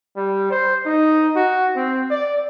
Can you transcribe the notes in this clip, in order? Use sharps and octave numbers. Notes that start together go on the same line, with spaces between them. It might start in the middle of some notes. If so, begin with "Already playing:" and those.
G3
C5
D#4
F#4
C4
D5